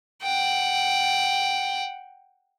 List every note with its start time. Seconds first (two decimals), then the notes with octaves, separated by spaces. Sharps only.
0.23 F#5 G5